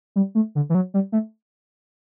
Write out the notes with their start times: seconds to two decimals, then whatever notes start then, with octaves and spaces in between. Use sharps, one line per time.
0.16 G3
0.35 A3
0.55 D3
0.70 E3
0.75 F#3
0.94 G3
1.12 A3